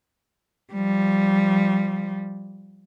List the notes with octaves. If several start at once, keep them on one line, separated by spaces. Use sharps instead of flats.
F3 G3